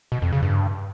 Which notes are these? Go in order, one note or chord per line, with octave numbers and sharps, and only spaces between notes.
B2
F2
C#3
G2